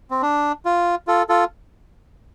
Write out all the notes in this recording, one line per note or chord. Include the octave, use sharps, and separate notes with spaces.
C4
D4
F4
F4 A4
F4 A4